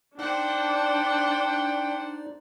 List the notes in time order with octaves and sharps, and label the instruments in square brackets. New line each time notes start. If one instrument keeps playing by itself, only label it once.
[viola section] D4 [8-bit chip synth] D#4 D5 [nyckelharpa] C5 F#5 [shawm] G5